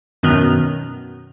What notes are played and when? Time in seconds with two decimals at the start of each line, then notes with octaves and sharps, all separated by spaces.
0.23 F#2 B2 D#3 B3 A#5 F6